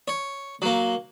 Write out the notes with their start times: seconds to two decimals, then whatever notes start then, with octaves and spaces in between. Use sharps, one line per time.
0.08 C#5
0.62 F#3 A#3